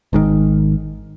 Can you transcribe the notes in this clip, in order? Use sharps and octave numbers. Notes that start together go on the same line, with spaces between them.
G#1 G#2 D#3